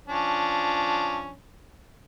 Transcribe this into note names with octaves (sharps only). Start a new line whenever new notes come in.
F3 C#4 D4